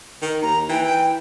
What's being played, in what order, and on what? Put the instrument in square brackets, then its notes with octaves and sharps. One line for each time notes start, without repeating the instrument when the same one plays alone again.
[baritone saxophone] D#3
[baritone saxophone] D#2 [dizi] A#5
[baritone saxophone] E3 [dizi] G5
[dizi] G5